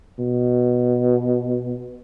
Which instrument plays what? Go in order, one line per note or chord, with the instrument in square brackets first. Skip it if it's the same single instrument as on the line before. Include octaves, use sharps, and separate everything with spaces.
[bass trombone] B2